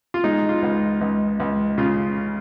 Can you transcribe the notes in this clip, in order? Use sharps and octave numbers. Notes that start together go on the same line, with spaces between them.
F4
G#3 D#4
F4
C#2
C#2
C#2
C#3 F4